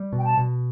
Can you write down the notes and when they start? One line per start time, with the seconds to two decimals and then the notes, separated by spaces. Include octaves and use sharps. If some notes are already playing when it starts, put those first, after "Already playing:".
Already playing: G3
0.13 B2
0.18 G5
0.25 A5
0.37 B2